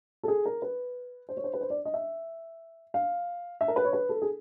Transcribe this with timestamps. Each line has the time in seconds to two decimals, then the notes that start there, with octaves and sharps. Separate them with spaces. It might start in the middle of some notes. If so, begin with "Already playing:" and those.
0.23 A4
0.28 G#4
0.46 A#4
0.62 B4
1.29 C5
1.37 C#5
1.44 C5
1.54 B4
1.61 C5
1.70 D5
1.85 D#5
1.94 E5
2.94 F5
3.61 E5
3.68 A#4
3.76 B4
3.84 C#5
3.93 B4
4.09 A4
4.22 G#4